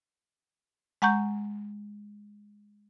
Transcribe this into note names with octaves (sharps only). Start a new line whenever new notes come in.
G#3 F#5 A#5 C#6 G6